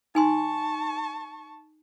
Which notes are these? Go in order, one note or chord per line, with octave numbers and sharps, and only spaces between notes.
D#4 G#5 A5 C6 C#6